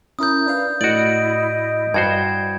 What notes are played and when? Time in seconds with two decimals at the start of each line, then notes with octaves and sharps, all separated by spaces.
0.19 C#4 E4 A#4 D#6 G6
0.46 D4 B4 F5
0.81 A2 E4 F#4 D5 D#5 D7
1.94 G2 F#4 C5 G#6